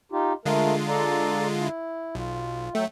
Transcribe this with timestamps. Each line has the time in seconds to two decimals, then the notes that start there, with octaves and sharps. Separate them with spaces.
0.12 D#4 F4 G4
0.45 D3 G#3 A3 F4 A#4
0.88 A4 D5 A#5
1.58 E4
2.15 B1 F4
2.75 F#3 A3 E5 G5